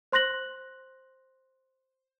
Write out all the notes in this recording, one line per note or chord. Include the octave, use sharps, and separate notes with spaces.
C5 C6 F#6 A#6 F#7